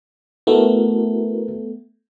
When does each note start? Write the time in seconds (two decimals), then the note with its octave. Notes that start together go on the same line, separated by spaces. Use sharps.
0.47 A3 B3 E4 F#4 A#4